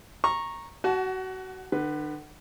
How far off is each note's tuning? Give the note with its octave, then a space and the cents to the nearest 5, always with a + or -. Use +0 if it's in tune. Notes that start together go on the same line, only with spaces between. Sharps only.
A#5 +0 C#6 -15
F#4 +25 F#5 +0 A5 -30
D3 +40 B4 +5